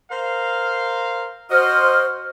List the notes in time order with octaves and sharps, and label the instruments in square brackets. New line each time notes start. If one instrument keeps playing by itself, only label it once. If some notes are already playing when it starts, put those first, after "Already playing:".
[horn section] A#4 C5 F5
[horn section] F#4 D#5 [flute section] C5 F6